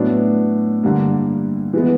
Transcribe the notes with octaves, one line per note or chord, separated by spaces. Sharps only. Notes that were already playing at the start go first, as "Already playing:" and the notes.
Already playing: A2 F#3 B3 D4
G2 D3 G3 A#3
E3 G#3 B3